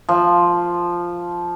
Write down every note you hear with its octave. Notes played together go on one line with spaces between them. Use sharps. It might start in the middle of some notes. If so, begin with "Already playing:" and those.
F3